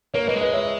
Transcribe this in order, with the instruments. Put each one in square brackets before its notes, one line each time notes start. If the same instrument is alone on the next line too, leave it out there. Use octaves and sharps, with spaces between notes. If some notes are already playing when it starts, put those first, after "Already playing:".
[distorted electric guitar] A#3 [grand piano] A#4 C#5
[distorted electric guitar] A#3 [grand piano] B4 D#5
[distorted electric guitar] G#3
[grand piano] B4 D#5
C#5 E5